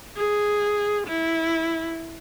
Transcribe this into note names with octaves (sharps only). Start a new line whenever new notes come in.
G#4
E4